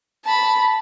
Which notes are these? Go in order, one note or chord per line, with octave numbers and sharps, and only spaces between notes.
A5 B5